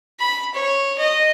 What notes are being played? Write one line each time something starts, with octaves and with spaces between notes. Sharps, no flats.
B5
C#5
D#5